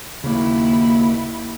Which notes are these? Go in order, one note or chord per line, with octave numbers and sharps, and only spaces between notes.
D#2 C#3 A#3 E4